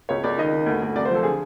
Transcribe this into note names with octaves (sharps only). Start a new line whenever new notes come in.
C#2 C#5
C#2 D5
D#3 D#5
D#3
D2
D2
C2 D5
C5
F3 A4
D3 G#4